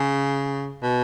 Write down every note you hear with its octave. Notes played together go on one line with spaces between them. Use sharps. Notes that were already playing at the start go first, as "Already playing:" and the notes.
Already playing: C#3
B2